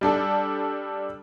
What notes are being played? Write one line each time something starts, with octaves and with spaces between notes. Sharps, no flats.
G3 D4 A4